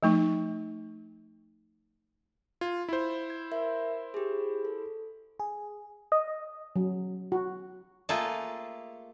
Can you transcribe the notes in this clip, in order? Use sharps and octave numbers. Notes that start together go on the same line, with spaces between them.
F3 A3 D#4
F4 G#6
E4 C5
G#6
A#4 E5
G4 G#4
A4
G#4
D#5
F#3
F#4
A3 A#3 F4 G#4 A4